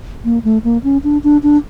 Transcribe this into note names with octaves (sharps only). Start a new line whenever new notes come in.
A#3
A3
A#3
C#4
D4
D4
D4